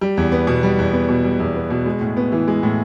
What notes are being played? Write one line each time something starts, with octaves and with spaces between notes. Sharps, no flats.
G3
E2
B3
B2
G3
E2
B3
B2
G3
E2
B3
B2
G#3
A2
B3
E3
G#3
A2